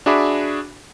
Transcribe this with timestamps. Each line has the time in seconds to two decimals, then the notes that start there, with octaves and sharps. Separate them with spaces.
0.06 D4 F#4 G#4 E5 B5 D6